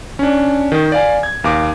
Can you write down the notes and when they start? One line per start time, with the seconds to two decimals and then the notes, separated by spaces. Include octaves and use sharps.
0.19 C#4 D4
0.72 D#3
0.92 D5 F5 G#5
1.23 G#6
1.44 D#2 F5 D6